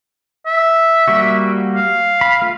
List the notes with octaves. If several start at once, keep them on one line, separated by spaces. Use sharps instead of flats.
E5
G3 A#3 F#4
F5
B5
A3 F4